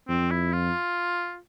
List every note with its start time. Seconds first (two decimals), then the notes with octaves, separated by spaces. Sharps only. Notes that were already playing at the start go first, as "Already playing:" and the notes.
0.08 F2 C4
0.31 E4
0.53 F4